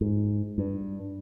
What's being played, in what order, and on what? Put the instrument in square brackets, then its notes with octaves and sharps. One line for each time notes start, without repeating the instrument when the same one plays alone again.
[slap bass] G#2
G2